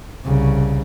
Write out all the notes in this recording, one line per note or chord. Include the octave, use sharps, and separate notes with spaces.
C2 C#3